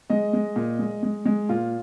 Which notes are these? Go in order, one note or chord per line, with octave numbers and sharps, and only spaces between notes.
G#3 D#5
G#3
A#2
G#3
G#3
G#3
A#2 F4